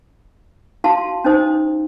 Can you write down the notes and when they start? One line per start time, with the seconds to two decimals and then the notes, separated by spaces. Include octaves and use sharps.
0.84 E4 F#4 F5 A5 C6
1.24 C#4 D#4 C5 D#6